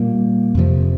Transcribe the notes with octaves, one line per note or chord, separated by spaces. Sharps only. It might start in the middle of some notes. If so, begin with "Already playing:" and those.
Already playing: A#2 G3 A#3
F2 C3 F3